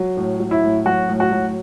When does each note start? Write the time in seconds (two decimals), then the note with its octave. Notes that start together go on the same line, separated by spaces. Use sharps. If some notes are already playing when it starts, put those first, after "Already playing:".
Already playing: F#3
0.17 A2
0.40 F#3
0.51 E4
0.63 A2
0.85 F#3 F#4
1.09 A2
1.20 F#4
1.32 F#3